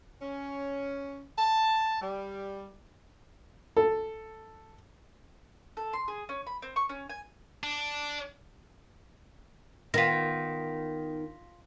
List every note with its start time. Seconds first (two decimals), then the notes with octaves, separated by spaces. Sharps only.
0.22 C#4
1.38 A5
2.01 G3
3.77 A4
5.77 A4
5.93 C6
6.08 G#4
6.29 C#4
6.47 B5
6.62 C4
6.76 C#6
6.89 C#4
7.10 G#5
7.63 D4
9.94 D#3 B3 D#4 F4 A#6 B6